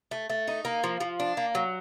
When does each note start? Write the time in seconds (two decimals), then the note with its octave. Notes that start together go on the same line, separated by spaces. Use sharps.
0.11 A3
0.30 A3
0.48 D#4
0.65 A#3
0.84 F3
1.00 F3
1.20 D4
1.37 A#3
1.55 F#3